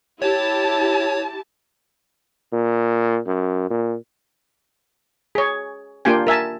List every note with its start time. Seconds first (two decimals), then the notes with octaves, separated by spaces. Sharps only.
0.22 E4 G4 C#5 A5
2.53 A#2
3.27 F#2
3.71 A#2
5.35 G#4 C#5
6.05 A#3 D4 F4 G4 G5 G#5
6.27 A#4 E5 G#5 A5